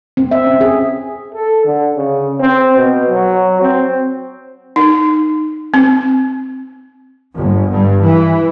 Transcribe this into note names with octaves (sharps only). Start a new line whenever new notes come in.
C4
E5
C#4
G#4
A4
D3
C#3
C4
B2
F#3
C4
D#4
C4
G1
G2
E3